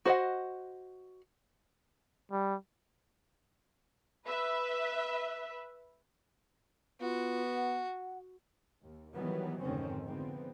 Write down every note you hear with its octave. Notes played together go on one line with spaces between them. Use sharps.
F#4 C5 D#5 E5 F#5
G3
B4 E5
B3 F4 F#4
F#5
D#2
D#3 E3 F#3 G3 B3
F1 G#2 D3 D#3 C4 C#4
G#2 D3 F3 B3 C4